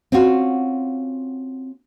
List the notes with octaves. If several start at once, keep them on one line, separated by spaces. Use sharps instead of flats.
C4 C#4 F4 F#4